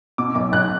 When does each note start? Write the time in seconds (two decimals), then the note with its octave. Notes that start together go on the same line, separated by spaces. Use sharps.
0.18 B2 D6
0.35 B1 D6
0.52 B1 F#6